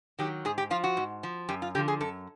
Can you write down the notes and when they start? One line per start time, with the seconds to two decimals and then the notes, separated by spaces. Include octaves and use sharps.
0.19 D#3 F#3 G4
0.45 G#2 G#4
0.58 G4
0.70 F3 F4
0.84 F#4
0.97 G#2
1.23 F3
1.49 F#2 G4
1.62 F4
1.75 D3 F3 G4
1.88 G#4
2.00 F#2 A4